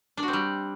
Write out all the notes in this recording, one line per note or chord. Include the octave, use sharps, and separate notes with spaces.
D4
F#4
C4
G3